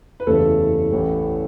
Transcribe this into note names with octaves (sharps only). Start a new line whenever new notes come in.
B4
F#1 E2 C#3 E3 G3 A3 A4
A1 A2 E3 G3